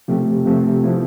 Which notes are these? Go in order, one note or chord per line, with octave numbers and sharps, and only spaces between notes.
C3 F3 A3 C4 G4
C3 F3 A3 C4 G4
F3 B3 E4